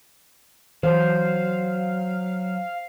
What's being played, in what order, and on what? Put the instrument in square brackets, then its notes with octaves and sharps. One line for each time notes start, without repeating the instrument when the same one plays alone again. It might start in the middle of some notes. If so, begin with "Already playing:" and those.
[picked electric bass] E3 [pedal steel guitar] F#3 [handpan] C5 [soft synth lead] F5